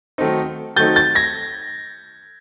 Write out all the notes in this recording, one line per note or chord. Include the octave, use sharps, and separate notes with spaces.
D#3 F#3 A3 C4 D#4
D#3 F#3 A3 C4 D#4 G6 A6
G6 A6
G#6 A#6